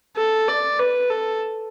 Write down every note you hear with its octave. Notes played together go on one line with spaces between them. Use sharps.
A4
D5
B4
A4